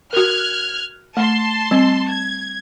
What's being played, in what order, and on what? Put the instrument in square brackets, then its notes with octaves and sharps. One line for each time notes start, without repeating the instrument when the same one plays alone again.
[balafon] F#4 A#4 [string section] F6 F#6 G#6
[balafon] A3 [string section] A5 C6
[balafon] G3 C4
[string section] G#6